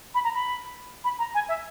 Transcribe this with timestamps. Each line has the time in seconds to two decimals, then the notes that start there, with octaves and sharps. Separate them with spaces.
0.15 B5
0.24 A#5
0.34 B5
1.04 B5
1.18 A#5
1.34 G#5
1.49 E5